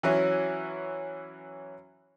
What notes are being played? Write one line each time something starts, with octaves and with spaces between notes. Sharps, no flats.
E3 F#3 C#4 E4